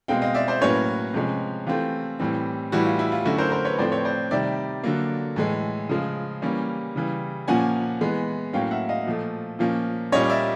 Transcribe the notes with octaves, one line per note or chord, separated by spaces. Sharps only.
B2 G#3 C4 F5 G5
D#5 F5
D5 E5
C5 D5
A2 F#3 A#3 C#4 B4 C#5
C3 F3 G#3 C#4
E3 A3 C4 F4 G4
A2 E3 G3 C4
A2 E3 G3 E4 F#4
F4
E4
F4
D3 F#3 A3 C#4 E4 F#4
A#4 C5
A#4 C5
B4 C#5
A2 F3 A3 C4 C5 D5
B4 C#5
C5 D5
C3 D#3 G3 D5 E5
D3 F#3 A#3
A2 E3 G#3
C#3 F3 G#3
E3 G3 A#3 C#4
C#3 E3 G3
A#2 F3 A#3 C#4 F#5 G#5
E3 G#3 B3
A2 F#3 A#3 C#4 F5 G5
E5 F#5
D#5 F5
A#2 F3 A3
A#2 F3 A#3 C#4
A#2 G3 A#3 C#4 C#5 D#5
D5 E5